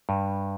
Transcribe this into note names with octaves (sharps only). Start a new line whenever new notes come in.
G2